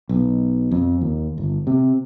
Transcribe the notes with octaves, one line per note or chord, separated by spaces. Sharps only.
B1
F2
D#2
G1
C3